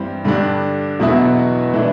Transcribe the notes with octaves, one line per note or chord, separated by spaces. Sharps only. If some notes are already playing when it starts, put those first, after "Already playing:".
Already playing: G2 E3 G3 C4
G2 D3 G3 D4
E2 B2 F#3 B3 E4
E3 A3 D4